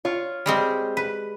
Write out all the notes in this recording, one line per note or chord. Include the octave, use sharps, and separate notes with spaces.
F4 C#5
G3 G#3 C4
B4